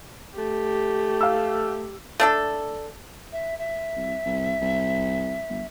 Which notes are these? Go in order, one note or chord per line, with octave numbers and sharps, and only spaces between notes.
A3 G4
F5 E6
A3 D4 A4
E5
E5
C2
C2
C2
G1